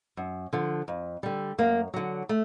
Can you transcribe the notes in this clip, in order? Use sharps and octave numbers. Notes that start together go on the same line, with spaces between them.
F#2
D3 F3
F2
D3 G3
F#2 A#3
D3 F#3
A3